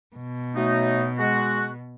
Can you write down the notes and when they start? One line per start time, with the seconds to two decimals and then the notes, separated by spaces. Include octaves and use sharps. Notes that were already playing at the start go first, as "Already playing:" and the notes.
0.16 B2
0.56 F#3 A3 D#4
1.18 G#3 F#4